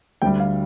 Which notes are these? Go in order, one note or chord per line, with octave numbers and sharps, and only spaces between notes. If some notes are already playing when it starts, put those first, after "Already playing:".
D2 D3 G3 G5
F5